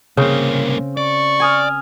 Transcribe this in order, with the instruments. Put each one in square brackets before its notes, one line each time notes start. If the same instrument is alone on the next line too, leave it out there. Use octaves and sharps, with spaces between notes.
[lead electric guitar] C2 A#3 [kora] C#3 [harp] C4
[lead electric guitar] D5 [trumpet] C#6
[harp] G#5 D#6 F6